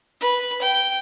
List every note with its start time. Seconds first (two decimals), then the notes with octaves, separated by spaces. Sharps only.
0.21 B4
0.62 G5